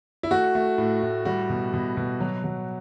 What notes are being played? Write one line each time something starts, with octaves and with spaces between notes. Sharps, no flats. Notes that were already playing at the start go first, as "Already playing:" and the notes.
E4
A3 F#4
A3
A2
A2
G3 F#4
B2
B2
B2
F#3
F#3